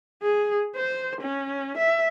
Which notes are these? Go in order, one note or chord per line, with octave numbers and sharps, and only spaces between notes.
G#4
C5
C#4
E5